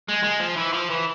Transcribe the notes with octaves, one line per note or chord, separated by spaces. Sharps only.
G#3
G#3
F3
E3
F3
E3